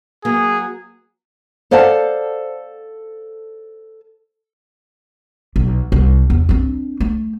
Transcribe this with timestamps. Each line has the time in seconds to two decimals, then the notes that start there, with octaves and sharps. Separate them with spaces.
0.25 F#3 A#3 G#4
1.71 A4 C5 D5 F5 F#5 A5
5.56 B1
5.92 C2
6.30 E2
6.49 C4 D4
7.00 A3